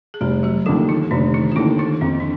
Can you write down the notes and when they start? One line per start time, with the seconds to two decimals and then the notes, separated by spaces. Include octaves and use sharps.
0.14 G#4
0.21 F1 G3 G4
0.43 F#3 F#4
0.66 D#2 D3 F3 F4
0.88 D#3 D#4
1.11 F1 D3 D4
1.34 D#3 D#4
1.52 F4
1.56 D#2 D3 E3 E4
1.79 D#3 D#4
2.01 F2 C4
2.20 D4